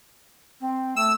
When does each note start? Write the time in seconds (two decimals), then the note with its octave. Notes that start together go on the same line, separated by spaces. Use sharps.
0.61 C4
0.96 A3 E6